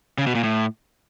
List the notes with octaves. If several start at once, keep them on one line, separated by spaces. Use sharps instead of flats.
C#3
B2
A#2
A2